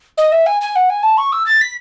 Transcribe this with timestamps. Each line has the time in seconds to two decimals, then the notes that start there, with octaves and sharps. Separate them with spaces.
0.18 D#5
0.32 E5
0.46 G#5
0.61 G#5
0.76 F#5
0.90 G#5
1.03 A5
1.17 C#6
1.32 E6
1.46 A6
1.61 B6